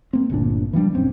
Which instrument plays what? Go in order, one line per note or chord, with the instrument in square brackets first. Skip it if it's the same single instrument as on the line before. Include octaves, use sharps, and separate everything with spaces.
[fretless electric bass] A#3 C4
G1 D2 A#2 D4
E3 F3 G3 D4
D#1 F#2 C4 C#4